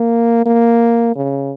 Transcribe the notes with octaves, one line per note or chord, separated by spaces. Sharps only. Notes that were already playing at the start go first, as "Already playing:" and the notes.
Already playing: A#3
A#3
C#3